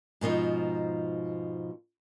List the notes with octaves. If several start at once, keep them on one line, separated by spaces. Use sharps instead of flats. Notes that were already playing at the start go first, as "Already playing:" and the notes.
G#2 B2 F3 D#4